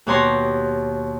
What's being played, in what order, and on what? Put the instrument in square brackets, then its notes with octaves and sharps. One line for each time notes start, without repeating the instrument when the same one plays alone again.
[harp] D#2 B2 G4 C#5 A#5 C6